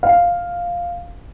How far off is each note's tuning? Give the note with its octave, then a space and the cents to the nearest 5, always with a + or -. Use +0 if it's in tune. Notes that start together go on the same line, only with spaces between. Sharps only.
F5 +0